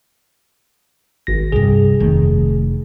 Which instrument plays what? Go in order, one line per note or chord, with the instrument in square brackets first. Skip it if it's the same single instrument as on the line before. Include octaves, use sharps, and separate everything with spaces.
[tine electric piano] G#1 A#6
[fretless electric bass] C2 G2 [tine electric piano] G#4
[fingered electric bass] F1 A3 [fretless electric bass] D#3